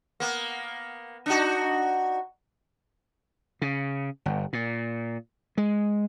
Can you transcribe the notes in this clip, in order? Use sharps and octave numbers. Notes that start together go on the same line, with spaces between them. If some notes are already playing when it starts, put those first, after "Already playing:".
A#3 B3
D4 D#4 F#4
C#3
G1
A#2
G#3